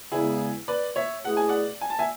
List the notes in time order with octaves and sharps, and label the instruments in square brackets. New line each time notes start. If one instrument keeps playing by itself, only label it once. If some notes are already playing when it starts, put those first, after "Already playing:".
[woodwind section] E2 C#3 G#3 B3 [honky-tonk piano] E4 G#4
[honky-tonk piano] B4 D5
C#5 E5
[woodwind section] B2 A3 E4 G#4 [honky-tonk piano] F#5
[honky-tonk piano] G#5
D5 F#5
G#5
A5
E5 G#5